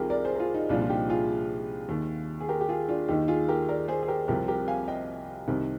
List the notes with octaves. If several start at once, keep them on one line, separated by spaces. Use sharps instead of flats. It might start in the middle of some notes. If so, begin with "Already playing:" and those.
Already playing: C2 C3 D#3 F4 G4 G#4 A#4
A#4 D5
G#4 C5
A#4
F4 G#4
D#4
C2 A#2 F3 D4 F4
F4
D#4 G4
F4 G#4
D#2 D#3
G#4
G4 A#4
G4
F4 G#4
D4 F4
D#2 D#3 D#4 G4
F4 G#4
G4 A#4
A#4 D5
G#4 C5
G#4
G4 A#4
C2 C3 F3 G4 A#4
G4 A#4
F5 G#5
D#5 G5
C2 C3 D#3